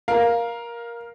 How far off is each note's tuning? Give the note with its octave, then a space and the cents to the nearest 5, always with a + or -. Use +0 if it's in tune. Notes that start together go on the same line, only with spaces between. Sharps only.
A#4 +10 F5 +0